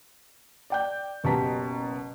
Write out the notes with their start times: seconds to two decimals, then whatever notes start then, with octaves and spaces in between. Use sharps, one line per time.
0.70 D5 G5 G6
1.24 F#1 B2 G4 A5 A#5 B6